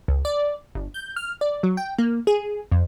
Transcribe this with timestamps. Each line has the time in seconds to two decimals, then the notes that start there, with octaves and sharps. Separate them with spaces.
0.08 C#2
0.25 D5
0.75 G1
0.94 G6
1.16 F6
1.41 D5
1.63 F#3
1.77 G5
1.99 A#3
2.27 G#4
2.72 F2